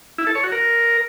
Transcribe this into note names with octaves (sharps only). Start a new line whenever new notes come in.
E4
A4
C#5
F#4
A#4